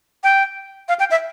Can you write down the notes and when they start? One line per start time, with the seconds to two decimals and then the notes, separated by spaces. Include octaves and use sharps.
0.24 G5
0.88 F5
0.99 G5
1.11 E5